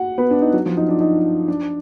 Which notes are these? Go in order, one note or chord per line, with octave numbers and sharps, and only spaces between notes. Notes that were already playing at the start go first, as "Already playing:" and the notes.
Already playing: F#4 F#5
B3 B4
D4
D#4
F#3 F#4
F3 F4
D#4
D4
D#4
D4